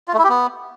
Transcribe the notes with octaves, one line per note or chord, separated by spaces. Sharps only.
F4
A3
E4
G4
B3